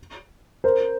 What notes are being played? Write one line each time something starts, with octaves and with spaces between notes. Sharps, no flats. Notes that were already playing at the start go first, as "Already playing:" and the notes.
A#4 C5